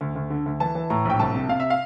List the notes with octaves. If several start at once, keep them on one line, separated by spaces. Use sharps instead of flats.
D2
D2
D3
D2
E3 A5
E3
A2 A#5
A#1 G5
C2 A5
C3
C3 F5
E5
F5